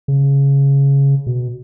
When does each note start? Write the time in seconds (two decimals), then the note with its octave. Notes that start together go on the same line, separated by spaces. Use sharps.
0.08 C#3
1.27 B2